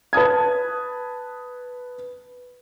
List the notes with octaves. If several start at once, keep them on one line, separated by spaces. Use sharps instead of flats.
B4 A5 D#6 G#6